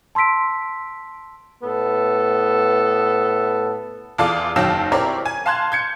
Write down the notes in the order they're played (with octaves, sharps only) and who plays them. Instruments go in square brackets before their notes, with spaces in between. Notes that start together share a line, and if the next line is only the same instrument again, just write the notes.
[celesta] A5 C6 E6 B6 D7
[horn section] A2 B3 A4
[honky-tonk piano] E2 F4 A4 D5 F5
F#1 D#3 F#3 F5 A5 E6
C4 E4 G4 A#4 C#5 D5
G#5
F5 A5 C6 F#6 G#6
G6 G#6 C#7